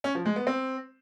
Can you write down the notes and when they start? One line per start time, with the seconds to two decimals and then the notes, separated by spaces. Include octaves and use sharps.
0.04 C#4
0.15 F3
0.25 G#3
0.36 B3
0.47 C4